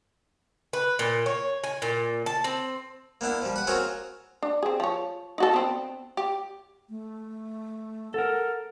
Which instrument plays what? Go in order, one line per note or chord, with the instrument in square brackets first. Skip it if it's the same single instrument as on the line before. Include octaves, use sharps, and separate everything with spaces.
[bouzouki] B4
A#2
C#5
G#5
A#2
A5
C4
[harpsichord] A#3 B3 D4 E4
F3 G3
B4 F#5
C4 F4 F#4 G#4 A#4 C#5
[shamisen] D4
C4 G#4
F3 C#5
D#4 F#4 A4
B3 C4 D4
G4
[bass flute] A3
[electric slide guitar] A4 A#4 [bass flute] F#5